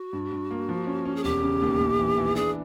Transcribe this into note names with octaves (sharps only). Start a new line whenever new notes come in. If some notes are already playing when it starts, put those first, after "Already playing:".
Already playing: F#4
G2
G2
A#3
F3
C#4
C#4
G#4
E1 G4
C#3
D#2
A#1
E3
E3
D4 G#4